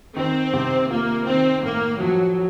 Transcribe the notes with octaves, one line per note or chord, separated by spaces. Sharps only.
D#3 C4
C3
A#3 F4
D#3 C4
A2 A#3
F3 F#3